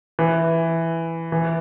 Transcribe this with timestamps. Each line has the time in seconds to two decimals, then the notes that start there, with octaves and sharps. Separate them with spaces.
0.19 E3
1.32 E3